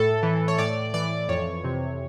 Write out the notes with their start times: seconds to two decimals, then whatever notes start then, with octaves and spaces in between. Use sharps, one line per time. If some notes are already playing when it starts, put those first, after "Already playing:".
Already playing: A2 A4
0.23 E3
0.48 C#5
0.58 A2 D5
0.94 E3 D5
1.29 F2 C#5
1.64 C3